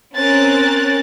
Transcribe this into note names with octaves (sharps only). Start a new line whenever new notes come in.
C4 C#4 A#4 F#6 A6